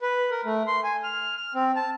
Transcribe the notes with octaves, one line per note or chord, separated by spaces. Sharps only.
B4
A#4
A3
C6
G#5
F6
F6
C4
A5